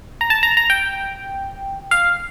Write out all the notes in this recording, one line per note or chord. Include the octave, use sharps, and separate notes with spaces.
A#5
A5
A#5
A#5
G5
F5